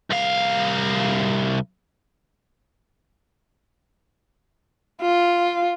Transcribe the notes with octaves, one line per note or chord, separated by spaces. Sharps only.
C2 F5
F4